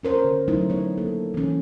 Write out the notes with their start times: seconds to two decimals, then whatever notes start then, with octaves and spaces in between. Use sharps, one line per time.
0.03 C#4 A#4 C5 C#5
0.24 D3
0.48 F#3 A3 D#4 E4
0.70 B3 C#5
0.98 A#3 A4
1.34 E3 C#4